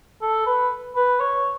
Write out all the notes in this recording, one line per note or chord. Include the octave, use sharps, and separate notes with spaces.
A4
B4
B4
C#5